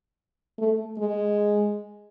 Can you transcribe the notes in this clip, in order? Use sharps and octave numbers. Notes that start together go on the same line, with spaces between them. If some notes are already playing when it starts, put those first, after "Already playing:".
A3
G#3